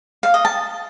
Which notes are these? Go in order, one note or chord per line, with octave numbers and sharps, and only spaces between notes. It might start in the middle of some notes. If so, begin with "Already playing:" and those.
F5
D#5
A5